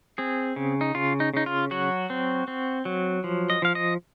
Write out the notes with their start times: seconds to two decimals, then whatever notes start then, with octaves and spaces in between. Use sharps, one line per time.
0.18 C4 G#4
0.56 C#3
0.81 D#4
0.95 C#3 F4
1.20 D#4
1.34 C#3 D#4
1.46 F4
1.71 F#3 F#4
2.10 C4
2.48 C4
2.85 F#3
3.24 F3
3.50 D#5
3.62 F3 F5
3.75 D#5